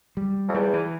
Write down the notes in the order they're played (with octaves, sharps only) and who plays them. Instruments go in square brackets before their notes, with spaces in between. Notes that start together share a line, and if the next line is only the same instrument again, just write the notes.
[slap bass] G3
[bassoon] F2
[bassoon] E2 [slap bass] G3
[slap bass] E3